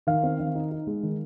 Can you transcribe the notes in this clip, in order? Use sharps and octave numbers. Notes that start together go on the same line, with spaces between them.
D#3 F5
C4
D#3
D#4
D#4
G#3
D#3